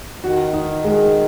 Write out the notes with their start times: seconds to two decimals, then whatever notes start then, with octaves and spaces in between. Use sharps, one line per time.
0.24 D#3 F#4
0.53 D#4
0.84 G#3